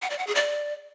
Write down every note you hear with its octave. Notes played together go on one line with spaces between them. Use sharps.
F#5
D5
F#5
G#4
D5